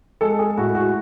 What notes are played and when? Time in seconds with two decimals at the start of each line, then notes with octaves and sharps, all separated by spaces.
0.21 G#3 A4
0.39 G#4
0.57 A2 F#4
0.75 F#4